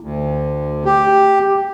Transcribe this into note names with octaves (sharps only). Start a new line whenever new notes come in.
D2
G4